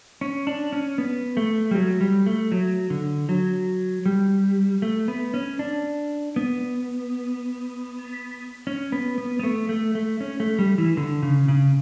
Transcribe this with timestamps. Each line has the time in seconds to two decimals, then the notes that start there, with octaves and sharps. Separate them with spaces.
0.21 C#4
0.47 D4
0.73 C#4
0.98 B3
1.37 A3
1.71 G3
1.75 F#3
2.01 G3
2.26 A3
2.52 F#3
2.90 D3
3.29 F#3
4.06 G3
4.82 A3
5.08 B3
5.34 C#4
5.59 D4
6.36 B3
8.67 C#4
8.92 B3
9.18 B3
9.39 B3
9.43 A3
9.69 A3
9.95 A3
10.21 C#4
10.40 A3
10.59 G3
10.78 E3
10.97 D3
11.23 C#3
11.48 C#3